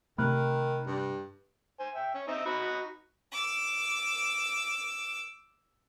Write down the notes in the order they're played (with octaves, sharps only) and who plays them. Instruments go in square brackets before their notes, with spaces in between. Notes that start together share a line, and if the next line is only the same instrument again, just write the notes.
[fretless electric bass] C3 A3 [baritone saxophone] D#3 [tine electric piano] B5 F6 F#6
[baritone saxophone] G2
[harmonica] C5 G#5
E5 G5
C#4
C4 D#4 E5
D#4 F#4 B5
[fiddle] D6 E6